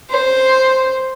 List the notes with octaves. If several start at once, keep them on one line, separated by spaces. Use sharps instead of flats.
C5